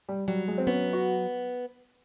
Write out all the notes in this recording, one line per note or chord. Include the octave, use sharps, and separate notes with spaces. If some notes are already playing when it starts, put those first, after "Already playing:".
G3
F#3 G3
G#3
C4
B3 C#4
F#4